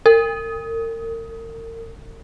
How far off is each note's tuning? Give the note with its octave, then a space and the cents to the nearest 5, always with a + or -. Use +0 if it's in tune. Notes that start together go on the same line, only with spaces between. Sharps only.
A#4 -40